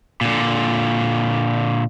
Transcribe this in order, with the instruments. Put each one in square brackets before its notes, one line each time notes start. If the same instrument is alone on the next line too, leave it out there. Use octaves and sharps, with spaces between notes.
[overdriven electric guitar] A#2 D3